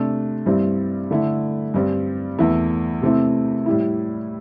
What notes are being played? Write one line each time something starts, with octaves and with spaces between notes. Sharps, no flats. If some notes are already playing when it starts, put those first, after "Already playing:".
Already playing: C3 A3 D4
G2 G3 C4 E4
D3 A3 E4
G2 G3 C4
E2 E3 A3 E4
C3 A3 C4 E4
A2 G3 E4